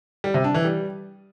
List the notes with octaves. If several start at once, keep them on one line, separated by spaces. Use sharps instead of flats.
G3
C3
D4
E3
G3